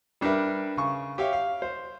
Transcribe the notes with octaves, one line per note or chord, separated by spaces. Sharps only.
G3 D4 A#4 B4 E5
C#3 C#6
G4 C#5 E5 F5
F5
C5